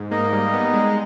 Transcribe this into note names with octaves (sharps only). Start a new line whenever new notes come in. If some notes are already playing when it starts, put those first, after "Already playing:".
Already playing: G#2
A#3 D#4 D#5
G3
B3
G#3